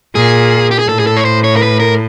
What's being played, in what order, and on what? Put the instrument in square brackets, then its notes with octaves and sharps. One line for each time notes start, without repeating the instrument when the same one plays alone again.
[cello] A#2 [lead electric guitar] G#4
[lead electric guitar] G4
G#4
[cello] A2 [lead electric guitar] A4
[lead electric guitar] G#4
A4
C#5
C5
C#5
A#4
B4
A#4